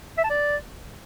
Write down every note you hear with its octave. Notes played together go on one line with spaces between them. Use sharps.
E5
A5
D5